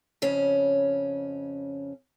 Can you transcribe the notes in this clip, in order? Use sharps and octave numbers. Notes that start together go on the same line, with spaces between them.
F2 C#3 C#4